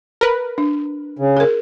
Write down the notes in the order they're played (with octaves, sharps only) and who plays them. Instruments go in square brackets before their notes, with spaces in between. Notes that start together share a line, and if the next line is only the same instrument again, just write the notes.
[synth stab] A#4 B4
[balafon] D4
[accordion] C#3
[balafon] G#4 A#4